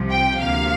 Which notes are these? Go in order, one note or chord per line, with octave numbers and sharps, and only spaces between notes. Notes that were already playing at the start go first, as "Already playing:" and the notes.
Already playing: C2 C3 F3
G5
D2 C3 F3 A#3 F5